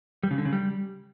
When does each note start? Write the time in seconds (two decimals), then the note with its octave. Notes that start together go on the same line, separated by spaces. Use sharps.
0.23 G3
0.31 C#3
0.38 D3
0.45 C#3
0.53 G3